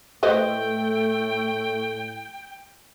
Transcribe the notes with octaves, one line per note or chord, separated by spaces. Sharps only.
A2 A3 B4 C5 D#5 G5